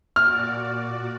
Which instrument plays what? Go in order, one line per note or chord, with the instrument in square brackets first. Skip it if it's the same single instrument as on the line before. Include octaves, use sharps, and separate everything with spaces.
[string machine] A#2 F#4 D5 [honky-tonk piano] F6